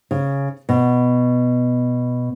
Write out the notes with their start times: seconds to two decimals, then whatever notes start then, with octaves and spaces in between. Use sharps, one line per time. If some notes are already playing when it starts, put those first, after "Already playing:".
0.11 C#3
0.69 B2